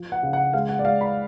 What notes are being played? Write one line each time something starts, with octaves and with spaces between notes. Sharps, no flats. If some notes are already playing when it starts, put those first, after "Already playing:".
Already playing: F3
F#5
C#3
F#5
G#3 F5
F#5
D5
G#3 F5
B5